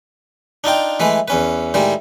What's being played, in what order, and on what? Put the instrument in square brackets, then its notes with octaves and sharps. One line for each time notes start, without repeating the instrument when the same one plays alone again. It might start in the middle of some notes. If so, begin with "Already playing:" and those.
[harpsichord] D4 D#4 F4 G5
E3 G#3 A3 B4
E2 C#4 B4
A2 D#3 G3 G#3